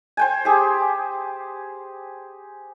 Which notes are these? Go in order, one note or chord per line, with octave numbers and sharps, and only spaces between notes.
C5 G5 G#5
G4 G#4